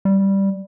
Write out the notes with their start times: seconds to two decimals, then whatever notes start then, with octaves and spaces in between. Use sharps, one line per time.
0.05 G3